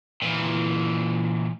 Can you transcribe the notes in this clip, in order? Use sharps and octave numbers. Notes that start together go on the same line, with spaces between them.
A#2 E3